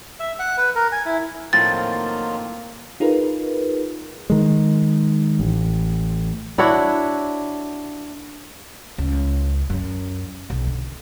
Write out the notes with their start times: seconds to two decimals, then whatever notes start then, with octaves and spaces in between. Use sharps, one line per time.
0.20 E5
0.39 F#5
0.57 B4
0.75 A#4
0.92 G#5
1.06 E4
1.53 A2 D#3 F3 F#3 A#3 C4 F4 A6
3.00 D#4 F4 G#4 A#4 B4
4.30 D#3 G#3
5.40 A1
6.58 D4 E4 F#4 C#5
8.98 C#2
9.70 F#2
10.50 B1
10.67 D3